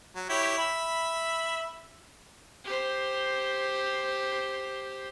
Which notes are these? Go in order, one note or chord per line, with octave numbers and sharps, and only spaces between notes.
F#3
E4 G4 C#5
E5 B5
G4 C5